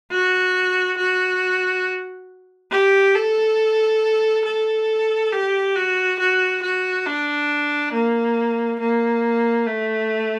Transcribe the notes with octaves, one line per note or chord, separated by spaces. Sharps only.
F#4
F#4
G4
A4
A4
G4
F#4
F#4
F#4
D4
A#3
A#3
A3